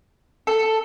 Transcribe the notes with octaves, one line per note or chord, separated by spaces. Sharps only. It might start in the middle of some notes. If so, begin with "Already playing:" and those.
A4